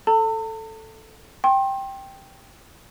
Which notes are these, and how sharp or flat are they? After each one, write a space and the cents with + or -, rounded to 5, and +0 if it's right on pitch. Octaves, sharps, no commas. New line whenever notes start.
A4 +0 A5 +45
G5 +0 C6 +35